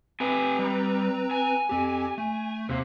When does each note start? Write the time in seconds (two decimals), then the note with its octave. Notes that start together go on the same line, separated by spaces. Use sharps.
0.20 C4 G4 B4 E5 G#5 A#5
0.59 G3
1.31 G#5
1.69 F2 C4 G4
2.18 A3
2.69 D#2 C3 A#3